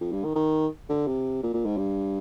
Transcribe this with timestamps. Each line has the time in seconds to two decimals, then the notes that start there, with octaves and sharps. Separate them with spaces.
0.01 F2
0.12 G2
0.24 D#3
0.35 D#3
0.89 D3
1.07 C3
1.43 A#2
1.54 A#2
1.66 G#2
1.77 G2